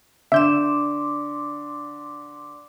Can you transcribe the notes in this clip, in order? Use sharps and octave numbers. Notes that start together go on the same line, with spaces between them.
D3 D5 E5 C6 D6 G6 E7